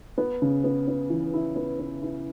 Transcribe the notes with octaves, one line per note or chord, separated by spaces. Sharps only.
B3
C#3
B3
B3
E3
E4
B3
B3
E4